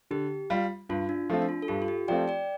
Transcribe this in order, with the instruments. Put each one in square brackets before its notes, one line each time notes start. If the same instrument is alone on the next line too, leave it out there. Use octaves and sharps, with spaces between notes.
[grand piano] D3 [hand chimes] G4
[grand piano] G3 F4
[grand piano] G2 [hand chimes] F4
[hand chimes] D4
[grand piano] F3 A3 C4 F4
[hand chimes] D4
F4
A4
[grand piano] G2 [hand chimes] G4
[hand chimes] F4
G4
[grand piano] F3 A3 C4 F4 [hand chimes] D5 G5
[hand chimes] D5 G5